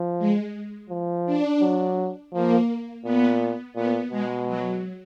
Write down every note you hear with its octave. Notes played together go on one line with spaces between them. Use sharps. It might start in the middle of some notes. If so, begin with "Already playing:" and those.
Already playing: F3
G#3
F3
D4
F#3
F3 A#3
A#2 B3
A#2 B3
B2 G#3
F#3